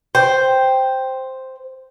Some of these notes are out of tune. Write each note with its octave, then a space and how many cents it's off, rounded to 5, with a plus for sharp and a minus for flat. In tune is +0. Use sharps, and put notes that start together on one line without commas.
C5 +0 G5 +0